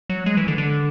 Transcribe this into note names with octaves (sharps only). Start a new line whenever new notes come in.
F#3
G#3
E3
D3
D3